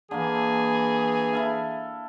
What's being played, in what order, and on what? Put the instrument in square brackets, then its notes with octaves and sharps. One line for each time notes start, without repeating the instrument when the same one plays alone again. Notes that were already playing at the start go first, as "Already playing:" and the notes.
[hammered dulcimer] D3 A#3 [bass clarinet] E3 [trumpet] G#4
[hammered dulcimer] E4 A4 F5